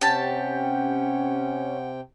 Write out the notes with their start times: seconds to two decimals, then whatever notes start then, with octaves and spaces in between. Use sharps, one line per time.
0.01 C3 C#4 G4 F#5 G5 A5